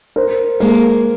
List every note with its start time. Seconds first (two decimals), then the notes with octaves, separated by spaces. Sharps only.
0.16 A#4 C5
0.60 G#3 A#3 A#4